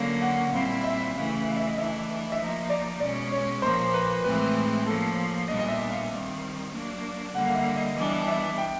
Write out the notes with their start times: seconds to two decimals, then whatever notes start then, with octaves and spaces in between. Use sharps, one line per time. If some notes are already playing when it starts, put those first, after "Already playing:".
Already playing: D3 F#3 A#3 C#4 F5
0.22 F#5
0.52 A#2 G3 C4 E4 F5
0.84 E5
1.14 C#3 E3 A3 F5
1.46 F5
1.57 E5
1.67 D#5
1.76 E3 A3 D4 E5
2.32 E5
2.38 F3 A#3 D#4 D#5
2.70 D5
3.00 B2 G#3 C#4 D5
3.32 C#5
3.62 A#2 F3 A#3 C5
3.94 B4
4.24 A2 E3 G#3 C4 B4
4.86 F3 A#3 C#4 A4
5.48 A#2 G3 B3 D4 D#5
5.59 D#5
5.68 E5
5.90 F5
6.10 D#3 G3 C4
6.72 F#3 A#3 D4
7.34 D3 G3 A#3 F#5
7.46 F5
7.55 E5
7.76 D#5
7.96 E3 G3 B3 D4 D#5
8.28 E5
8.58 G5